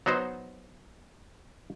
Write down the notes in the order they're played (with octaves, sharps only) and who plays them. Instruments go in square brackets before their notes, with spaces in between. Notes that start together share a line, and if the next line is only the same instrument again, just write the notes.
[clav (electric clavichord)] F#3 B3 D#4 C5